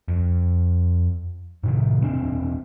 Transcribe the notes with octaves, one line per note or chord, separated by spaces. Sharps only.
F2
A2 C3 D#3
E1 C4 D4